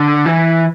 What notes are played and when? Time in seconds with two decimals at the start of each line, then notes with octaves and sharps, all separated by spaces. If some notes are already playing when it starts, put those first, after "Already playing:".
Already playing: D3
0.26 E3